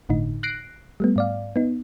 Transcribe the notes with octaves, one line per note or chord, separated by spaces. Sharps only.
G1 A2 D3 D#4
F#6 A#6 C7 D7
G3 A3 B3
G#2 D5 F5
B3 D#4